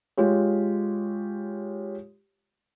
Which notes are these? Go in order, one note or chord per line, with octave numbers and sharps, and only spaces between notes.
G#3 F4 G4 C#5